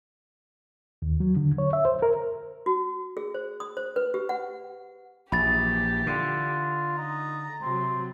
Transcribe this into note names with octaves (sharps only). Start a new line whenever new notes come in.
D#2
F#3
D3
C#5
E5
C5
A#4
F#4
G#4
C5
D#6
C5
B4
G4
F#5
A#1 E3 G4 B5 A6
D3 F4
D#4 A#5
C3 F#3 C4